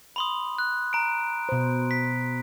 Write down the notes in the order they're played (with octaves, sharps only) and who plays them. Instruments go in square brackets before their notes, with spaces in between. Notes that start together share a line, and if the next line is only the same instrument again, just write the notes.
[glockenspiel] B5 C6 D#6
F#6
A#5 D7
[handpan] B2 C5
[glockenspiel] B6